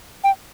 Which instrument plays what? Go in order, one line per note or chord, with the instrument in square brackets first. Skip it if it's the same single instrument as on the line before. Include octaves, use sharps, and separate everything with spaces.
[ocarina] G5